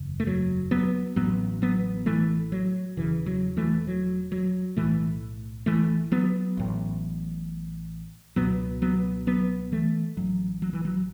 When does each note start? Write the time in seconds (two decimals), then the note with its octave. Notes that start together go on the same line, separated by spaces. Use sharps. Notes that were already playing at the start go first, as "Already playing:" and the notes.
Already playing: F#1 E2 C#3
0.20 A3
0.27 F#3
0.71 F#3 B3
1.16 A1 A2 F#3 B3
1.62 F#3 B3
2.06 E3 A3
2.52 F#3
2.97 E1 E2 C#3 E3
3.26 F#3
3.57 E3 A3
3.87 F#3
4.32 F#3
4.77 B1 A2 E3 A3
5.66 E3 A3
6.12 F#3 B3
6.57 A1 A2
8.36 C#2 B2 F#3 B3
8.82 F#3 B3
9.27 F#3 B3
9.72 E3 A3
10.17 A1 A2 F#3
10.62 F#3
10.73 E3
10.85 F#3